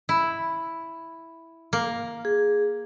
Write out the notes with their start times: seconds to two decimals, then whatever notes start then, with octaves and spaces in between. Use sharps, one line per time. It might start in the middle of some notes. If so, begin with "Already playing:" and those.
0.09 E4
1.73 A#3
2.25 G#4